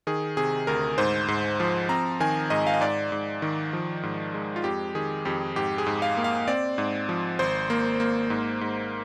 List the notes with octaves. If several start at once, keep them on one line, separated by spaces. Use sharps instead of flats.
D#3 G#4
C3 G#4
D2 A#4
G#2 C5
G#2
F3
C4 A#5
D#3 G#5
G#2 D#5
F5
D#5
G#2 D5
G#2
D#3
F3
G#2
G#3
F4
F2 G4
D#3 G#4
F2 G4
G#2 G4
G#4
G#2
F5
A#3
F5
C4 D5
G#2
F3
G#1 C5
A#3
A#3
G#2
G#2